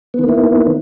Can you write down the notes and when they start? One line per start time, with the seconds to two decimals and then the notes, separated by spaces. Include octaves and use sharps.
0.14 B3
0.19 D#3
0.24 A#3
0.29 E4